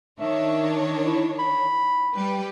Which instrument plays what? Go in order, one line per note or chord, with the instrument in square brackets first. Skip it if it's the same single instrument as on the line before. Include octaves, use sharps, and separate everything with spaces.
[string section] D#3 D4 C#5 [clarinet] E5
[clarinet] E4
B5
[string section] G3 G4 B4